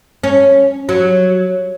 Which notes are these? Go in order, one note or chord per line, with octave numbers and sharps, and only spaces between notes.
C#4
F#3